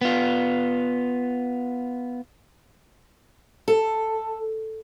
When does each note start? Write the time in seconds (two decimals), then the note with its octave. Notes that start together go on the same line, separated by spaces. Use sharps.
0.01 B3 F4
3.68 A4